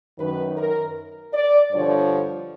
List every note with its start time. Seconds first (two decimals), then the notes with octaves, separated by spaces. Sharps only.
0.19 F#2 D#3 B4
0.57 A#4
1.34 D5
1.71 G2 D3 F3 C#5